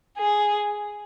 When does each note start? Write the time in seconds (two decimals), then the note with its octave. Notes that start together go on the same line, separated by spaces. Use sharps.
0.18 G#4